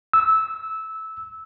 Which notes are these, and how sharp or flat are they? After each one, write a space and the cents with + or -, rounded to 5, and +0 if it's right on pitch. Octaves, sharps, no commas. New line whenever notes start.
E6 -15